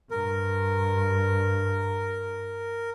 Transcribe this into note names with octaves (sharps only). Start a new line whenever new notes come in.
G2 A#4